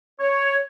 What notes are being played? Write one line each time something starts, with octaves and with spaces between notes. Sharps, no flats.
C#5